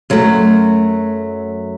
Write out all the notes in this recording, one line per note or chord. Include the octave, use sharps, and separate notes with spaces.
F#2 F#3 A3